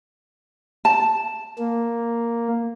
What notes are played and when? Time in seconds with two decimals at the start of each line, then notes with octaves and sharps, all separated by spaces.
0.85 A5
1.59 A#3